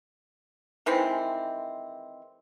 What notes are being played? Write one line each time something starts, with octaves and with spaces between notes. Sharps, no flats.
D#3 E3 G#3 C4